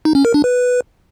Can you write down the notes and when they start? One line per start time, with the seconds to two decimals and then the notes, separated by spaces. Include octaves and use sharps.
0.05 D#4
0.15 C#4
0.25 A#4
0.34 D4
0.44 B4